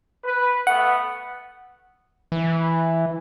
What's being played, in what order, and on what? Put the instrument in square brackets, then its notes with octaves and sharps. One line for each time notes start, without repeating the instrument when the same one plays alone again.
[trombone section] B4
[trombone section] A3 B3 [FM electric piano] F#5
[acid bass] E3